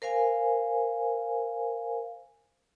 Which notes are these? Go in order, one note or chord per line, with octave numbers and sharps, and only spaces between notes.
A#4 C5 F5 G#5